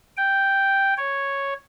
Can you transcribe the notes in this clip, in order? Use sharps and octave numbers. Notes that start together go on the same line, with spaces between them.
G5
C#5